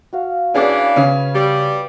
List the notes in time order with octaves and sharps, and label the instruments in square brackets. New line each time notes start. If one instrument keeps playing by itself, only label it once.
[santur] F#4 F5
[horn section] E3 D4 [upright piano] C#4 G#4 D5 [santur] B4 F5
[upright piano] C#3 C#4
[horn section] G3